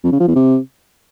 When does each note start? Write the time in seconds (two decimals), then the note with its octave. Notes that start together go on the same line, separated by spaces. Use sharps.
0.04 F2
0.12 C#3
0.20 F3
0.28 E2
0.36 C3